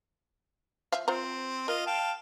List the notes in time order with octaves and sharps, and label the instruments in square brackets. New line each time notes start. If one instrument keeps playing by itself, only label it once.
[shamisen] F3 E5 F5
[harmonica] C4 [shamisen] F4 C5 A#5
[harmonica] F4 D#5 [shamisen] A#4
[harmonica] F5 G5 A5